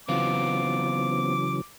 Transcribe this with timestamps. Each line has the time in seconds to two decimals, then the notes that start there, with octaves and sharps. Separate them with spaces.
0.08 C#3 E3 F#3 B3 C4 F4 D6